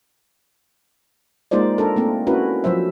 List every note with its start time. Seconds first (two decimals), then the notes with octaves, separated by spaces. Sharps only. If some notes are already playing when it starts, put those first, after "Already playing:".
1.51 G#3 A#3 D#4 F4 C5 D5
1.78 D4 A4 A#4
1.96 A3 A#3 C4
2.27 C#4 E4 F#4 A#4 B4
2.64 F3 F#3 C5 E5